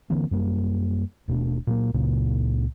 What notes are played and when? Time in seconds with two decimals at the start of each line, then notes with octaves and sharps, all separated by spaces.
0.10 D3 E3 A#3 C4
0.31 F#2 G3 A#3
1.28 D#1 B2 A3 D4
1.67 A#2 F#3 A#3
1.94 C#2 A#2 C#3 A#3